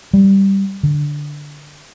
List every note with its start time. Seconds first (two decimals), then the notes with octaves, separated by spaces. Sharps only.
0.13 G3
0.83 D3